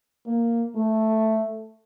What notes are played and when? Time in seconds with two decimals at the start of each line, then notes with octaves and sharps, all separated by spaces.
0.27 A#3
0.76 A3